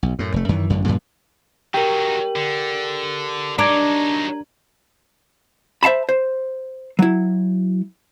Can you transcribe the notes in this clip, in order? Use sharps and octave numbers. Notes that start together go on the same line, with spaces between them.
B1
F#2 A2
F1 A3
F#2 D#3 E3
A1 F#2 D3
F#2 A#2 F3 G#3
F#3 D#4 G4 A#4 G5
D3
F#3 D4 D#4 A#5 G#6
C5 E5 F5 A5 B5
C5
F#3 E4